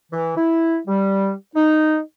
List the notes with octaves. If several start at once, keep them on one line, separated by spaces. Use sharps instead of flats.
E3
E4
G3
D#4